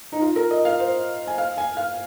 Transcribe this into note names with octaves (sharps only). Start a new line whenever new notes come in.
D#4
F4
A#4
D#5
F5
C5
G#5
F5
G#5
F5